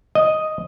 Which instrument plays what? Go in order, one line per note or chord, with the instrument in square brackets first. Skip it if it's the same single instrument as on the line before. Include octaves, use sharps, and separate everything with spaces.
[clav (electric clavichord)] D#5